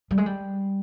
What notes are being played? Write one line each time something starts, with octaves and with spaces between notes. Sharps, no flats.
G3
G#3
G3